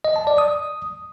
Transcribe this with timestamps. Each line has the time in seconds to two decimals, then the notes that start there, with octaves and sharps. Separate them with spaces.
0.05 D#5
0.16 A5
0.27 D5
0.38 D#6